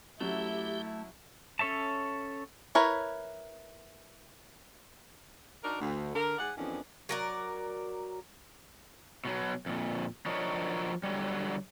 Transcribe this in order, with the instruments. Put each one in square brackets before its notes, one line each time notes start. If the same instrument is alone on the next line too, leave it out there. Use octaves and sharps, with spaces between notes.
[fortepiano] F#3 C#4 [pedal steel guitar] A3 [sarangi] E4 [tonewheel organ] G4
[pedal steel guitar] C#4 A4 C#5 E5 A5
[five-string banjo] E4 A#4 B4 C#5
[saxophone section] D4 D#4 F#4 A#4
D2
D3 A#4
G#2 G#4 D5 F#5
F2 D#3 E3 B3 C#4 D4
[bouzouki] F#3 A#4 D5
[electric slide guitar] B2 F#3
F2 A#2
F3 F#3 D4 A#4 C#5 D#5
D3 F#3 G3